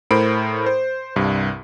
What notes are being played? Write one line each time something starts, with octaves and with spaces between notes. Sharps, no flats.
A2 A#4 C5 B5 D7
C5
C2 G2